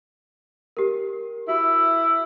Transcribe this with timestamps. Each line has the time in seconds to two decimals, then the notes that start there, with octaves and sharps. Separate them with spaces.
0.77 G4 A#4
1.48 E4 F#4